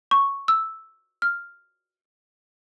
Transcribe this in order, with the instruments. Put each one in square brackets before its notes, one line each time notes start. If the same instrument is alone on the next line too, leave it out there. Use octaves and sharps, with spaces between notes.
[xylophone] C#6
E6
F6